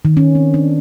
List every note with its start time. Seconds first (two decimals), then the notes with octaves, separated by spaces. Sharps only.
0.05 D#3
0.17 C#4
0.35 C4
0.54 D4